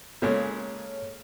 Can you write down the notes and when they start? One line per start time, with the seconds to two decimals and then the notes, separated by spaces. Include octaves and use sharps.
0.22 A#2 C#3 G#3 A4 C#5